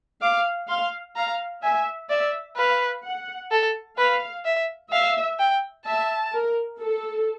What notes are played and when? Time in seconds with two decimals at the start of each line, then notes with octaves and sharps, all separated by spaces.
0.22 F5 D6
0.69 F5 C6
1.16 F5 A#5
1.63 E5 G#5
2.10 D5 E5
2.57 B4 F5
3.04 F#5
3.51 A4
3.98 B4 F5
4.45 E5
4.92 E5 F5
5.39 G5
5.86 E5 A5
6.33 A#4
6.80 A4